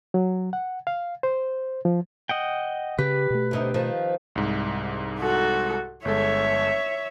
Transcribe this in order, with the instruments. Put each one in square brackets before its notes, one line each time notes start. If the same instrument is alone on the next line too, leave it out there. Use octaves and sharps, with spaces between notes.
[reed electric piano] F#3
F#5
F5
C5
F3
[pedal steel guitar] D#5 F#5 G5
[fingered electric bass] C#3 [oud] G4 [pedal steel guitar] B4
[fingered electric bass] B2 A3
[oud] D2 C3 D#4
D#3 F3
[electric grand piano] C2 G#2
[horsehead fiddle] F#4 A4
[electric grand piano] G1 G#3 A4 [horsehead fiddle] C#5 E5